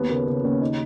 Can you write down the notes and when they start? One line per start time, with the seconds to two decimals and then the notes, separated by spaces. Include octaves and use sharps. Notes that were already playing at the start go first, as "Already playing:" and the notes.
Already playing: D#2 B3
0.09 C#3 A#3
0.27 C#3
0.43 D#2 C#4
0.61 D#4